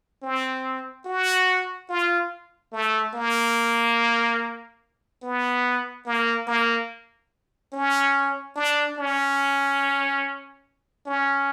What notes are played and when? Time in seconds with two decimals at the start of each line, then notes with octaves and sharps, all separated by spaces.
0.23 C4
1.06 F#4
1.89 F4
2.72 A3
3.14 A#3
5.23 B3
6.06 A#3
6.47 A#3
7.73 C#4
8.56 D4
8.98 C#4
11.06 C#4